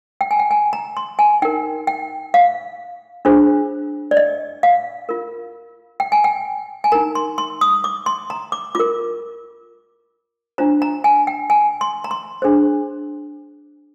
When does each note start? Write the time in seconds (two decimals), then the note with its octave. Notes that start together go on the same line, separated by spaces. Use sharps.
0.21 G5
0.31 G#5
0.39 G5
0.51 G#5
0.73 A#5
0.97 C6
1.19 G#5
1.42 D#4 A#4 G5
1.87 G5
2.34 F5
3.25 D4 F4 G#4 C5
4.11 D5
4.17 D#5
4.63 F5
5.09 F4 A#4
6.00 G5
6.12 G#5
6.24 G5
6.84 G#5
6.92 D#4 A#4 A#5
7.15 C6
7.38 C6
7.61 D#6
7.84 D6
8.06 C6
8.30 A#5
8.52 D6
8.75 F4 A#4 D6
10.58 D4 F4 C5 A#5
10.82 A#5
11.04 G#5
11.27 G5
11.50 G#5
11.81 C6
12.04 A#5
12.11 C6
12.42 D4 G#4 C5